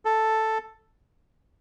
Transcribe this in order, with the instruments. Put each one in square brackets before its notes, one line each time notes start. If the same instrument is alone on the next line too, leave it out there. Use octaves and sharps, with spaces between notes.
[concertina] A4